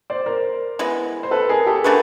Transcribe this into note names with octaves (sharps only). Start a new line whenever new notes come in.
C5 D5
A#4 C5
E3 G#3 B3
C5
A4 B4
G#4 A#4
G4 A4
A3 D4 F#4 G#4 A#4 B4